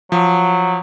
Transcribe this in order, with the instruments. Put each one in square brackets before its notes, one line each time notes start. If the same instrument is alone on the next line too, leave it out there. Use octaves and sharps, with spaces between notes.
[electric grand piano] F3 [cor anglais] F#3